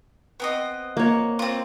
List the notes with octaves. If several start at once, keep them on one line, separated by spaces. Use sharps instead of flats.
B3 C4 D#5
A#3 C#5
C4 F4